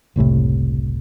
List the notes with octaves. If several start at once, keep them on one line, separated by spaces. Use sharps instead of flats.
F#1 C2 A2 C3